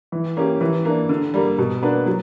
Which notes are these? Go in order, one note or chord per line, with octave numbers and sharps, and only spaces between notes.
E3
A#3 C#4 G4
E3
A#3 D4
D3
G3 A#3
B2
A#3 D4 F#4 B4
F#3